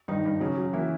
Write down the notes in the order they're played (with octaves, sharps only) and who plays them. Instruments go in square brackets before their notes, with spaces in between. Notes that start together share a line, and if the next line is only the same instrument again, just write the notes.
[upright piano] G2 [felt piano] D#3 D#4
[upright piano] G2
[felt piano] C#3 C#4 [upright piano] F#3
[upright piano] F#3
[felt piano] E3 E4 [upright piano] A#3